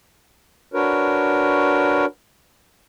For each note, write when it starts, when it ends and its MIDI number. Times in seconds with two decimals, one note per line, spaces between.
0.74 2.05 62
0.74 2.05 66
0.74 2.05 70
0.74 2.05 71
0.74 2.05 73